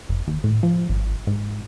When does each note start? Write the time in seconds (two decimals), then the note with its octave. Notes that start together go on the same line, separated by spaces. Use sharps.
0.09 F#1
0.27 D#2
0.44 A2
0.63 F3
0.89 G#1
1.27 G#2